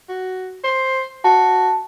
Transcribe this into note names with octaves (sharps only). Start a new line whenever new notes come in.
F#4
C5
F#4 A5